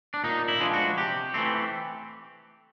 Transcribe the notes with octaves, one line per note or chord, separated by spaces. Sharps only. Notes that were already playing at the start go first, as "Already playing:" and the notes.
D4
A#2 D#4
E4
F3 G#3 B3 D4
F#4
C3 G4
E3 A3 C4